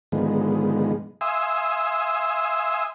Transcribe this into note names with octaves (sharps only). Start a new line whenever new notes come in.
G#2 D3 D#3 F3 G#3 B3
E5 F5 G#5 C6 D#6 E6